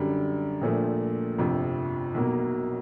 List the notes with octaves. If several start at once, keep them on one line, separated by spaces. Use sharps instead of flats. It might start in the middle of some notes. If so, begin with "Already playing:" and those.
Already playing: F#2 D3 G3
A#1 A#2 F3 A3
G1 F2 C3 F3
B1 B2 F#3 A#3